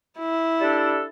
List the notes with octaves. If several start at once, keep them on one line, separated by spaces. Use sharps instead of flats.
E4
G3 D4 A4